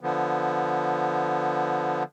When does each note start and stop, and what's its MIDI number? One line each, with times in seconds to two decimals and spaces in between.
0.01 2.03 50
0.01 2.03 53
0.01 2.03 59